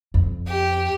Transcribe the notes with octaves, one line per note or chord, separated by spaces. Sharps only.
F2
G4